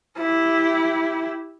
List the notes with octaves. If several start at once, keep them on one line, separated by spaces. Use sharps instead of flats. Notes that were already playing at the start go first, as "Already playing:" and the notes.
E4 G4